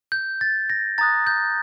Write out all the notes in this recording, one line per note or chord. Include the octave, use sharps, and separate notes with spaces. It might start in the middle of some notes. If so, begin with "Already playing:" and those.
G6
A6
A#6
A#5 D#6 F#6 A6
G6